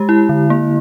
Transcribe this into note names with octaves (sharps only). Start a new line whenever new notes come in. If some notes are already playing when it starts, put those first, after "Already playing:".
Already playing: G#3 G4
E4
D3
A#3